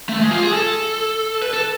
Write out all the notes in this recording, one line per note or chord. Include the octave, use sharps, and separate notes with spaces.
A3
G#3
F4
G#4
A4
B4
A4